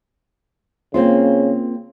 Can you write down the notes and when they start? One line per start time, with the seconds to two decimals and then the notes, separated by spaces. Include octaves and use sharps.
0.94 C#3 A#3 C4 F4